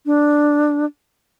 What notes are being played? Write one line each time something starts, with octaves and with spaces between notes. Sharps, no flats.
D4